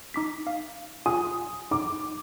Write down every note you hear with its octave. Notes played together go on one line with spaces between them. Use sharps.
D#4 D6 B6
F5
F4 G#5 D#6
D#4 D6